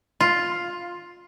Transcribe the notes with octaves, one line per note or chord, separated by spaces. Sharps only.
F4